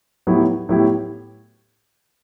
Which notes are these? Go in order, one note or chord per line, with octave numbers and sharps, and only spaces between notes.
A2 F#3 B3 E4 G4
A2 F#3 B3 E4 G4